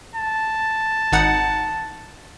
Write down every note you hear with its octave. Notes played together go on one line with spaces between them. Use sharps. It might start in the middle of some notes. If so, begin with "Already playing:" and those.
A5
G#1 D#4 F#5